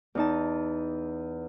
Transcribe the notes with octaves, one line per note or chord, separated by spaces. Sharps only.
E2 D#4 A5